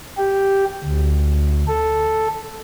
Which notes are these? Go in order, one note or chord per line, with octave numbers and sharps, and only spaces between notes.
G4
D2
A4